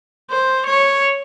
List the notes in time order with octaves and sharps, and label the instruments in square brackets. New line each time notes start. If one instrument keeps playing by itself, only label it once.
[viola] C5
C#5